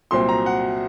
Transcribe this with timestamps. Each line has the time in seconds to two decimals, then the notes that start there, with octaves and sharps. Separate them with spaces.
0.11 C2 A#2 F#3 C4 C6
0.29 A#5
0.46 F#5